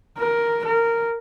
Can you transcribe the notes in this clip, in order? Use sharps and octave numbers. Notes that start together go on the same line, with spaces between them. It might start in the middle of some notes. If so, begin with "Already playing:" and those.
A#4
A#4